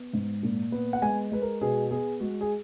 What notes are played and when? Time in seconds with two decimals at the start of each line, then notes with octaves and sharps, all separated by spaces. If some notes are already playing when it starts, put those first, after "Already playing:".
Already playing: B3
0.13 G#2
0.43 A#2
0.72 B3
0.93 F#5
1.02 G#3 G#5
1.32 G#3 B4
1.42 A#4
1.61 B2 G#4
1.91 B3 G#4
2.21 G#3 F#4
2.41 G#4